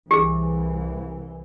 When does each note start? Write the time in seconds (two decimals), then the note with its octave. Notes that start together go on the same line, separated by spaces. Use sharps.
0.11 C2 E3 G4 G#4